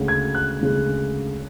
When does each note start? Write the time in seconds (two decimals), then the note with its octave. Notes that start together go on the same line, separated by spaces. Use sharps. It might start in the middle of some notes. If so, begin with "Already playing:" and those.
Already playing: D2 C#3 G#3
0.08 G#6
0.35 F#6
0.61 D2 C#3 G#3